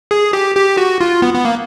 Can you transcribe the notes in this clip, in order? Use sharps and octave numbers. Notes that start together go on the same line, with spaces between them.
G#4
G4
G4
F#4
F4
B3
B3
A#3